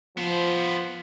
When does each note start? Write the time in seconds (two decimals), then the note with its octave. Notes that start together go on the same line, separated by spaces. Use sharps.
0.17 F3 B3 C5